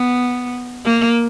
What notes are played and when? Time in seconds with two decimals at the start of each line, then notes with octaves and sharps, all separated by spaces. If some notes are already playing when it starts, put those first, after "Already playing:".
Already playing: B3
0.85 A#3